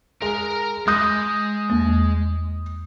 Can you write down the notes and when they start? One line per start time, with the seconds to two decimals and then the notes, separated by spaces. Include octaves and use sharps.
0.22 G#3 A#4 A#5
0.88 G#3 D#6 G6 A#6
1.70 E2 A#3